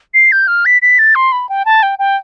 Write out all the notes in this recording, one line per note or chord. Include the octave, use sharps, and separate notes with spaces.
C7
G6
F6
B6
B6
A6
C6
B5
G5
A5
G5
G5